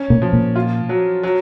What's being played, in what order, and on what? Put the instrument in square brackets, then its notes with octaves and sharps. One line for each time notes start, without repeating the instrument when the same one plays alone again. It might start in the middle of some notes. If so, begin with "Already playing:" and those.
Already playing: [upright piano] C#4
[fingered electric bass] A#2
[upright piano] F3
[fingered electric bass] A#2
[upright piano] F4
F#3
F#3